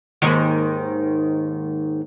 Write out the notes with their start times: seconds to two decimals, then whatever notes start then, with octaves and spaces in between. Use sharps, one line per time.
0.22 D#2 G#2 D#3